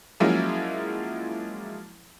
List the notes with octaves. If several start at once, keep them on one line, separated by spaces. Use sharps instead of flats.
F3 F#3 G#3 A#3 C#4 E4